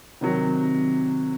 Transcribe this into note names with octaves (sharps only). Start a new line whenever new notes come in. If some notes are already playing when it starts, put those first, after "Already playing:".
C3 D#3 F#3